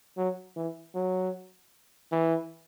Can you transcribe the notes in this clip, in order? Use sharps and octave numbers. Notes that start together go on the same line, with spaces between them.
F#3
E3
F#3
E3